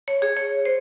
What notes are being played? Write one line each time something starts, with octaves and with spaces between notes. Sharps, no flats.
C#5
G#4
C#5
C5